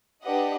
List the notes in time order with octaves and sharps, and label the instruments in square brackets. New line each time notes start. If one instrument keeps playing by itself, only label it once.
[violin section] D4 G4 B4 D#5 F#5